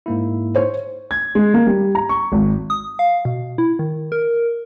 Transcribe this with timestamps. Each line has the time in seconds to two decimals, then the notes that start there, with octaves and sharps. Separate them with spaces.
0.06 G#2 A#3 E4
0.55 C5 C#5
1.11 G#6
1.35 G#3
1.54 A#3
1.67 G3
1.95 A#5
2.09 C#6
2.32 G#1
2.70 D#6
2.99 F5
3.25 B2
3.58 E4
3.79 D#3
4.12 A#4